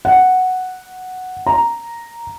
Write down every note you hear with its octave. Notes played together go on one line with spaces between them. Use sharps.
F#5
A#5